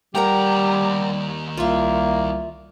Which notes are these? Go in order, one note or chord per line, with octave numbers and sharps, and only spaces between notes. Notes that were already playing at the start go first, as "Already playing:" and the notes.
D#2 G3 G4 A#4 F#5 G5 A#5
C2 A#3 F4 E5